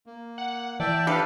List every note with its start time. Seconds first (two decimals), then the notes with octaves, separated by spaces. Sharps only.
0.06 A#3
0.38 F#5
0.80 E3 D5 E5 G5 A5
1.07 D4 G4 A4 B4 F5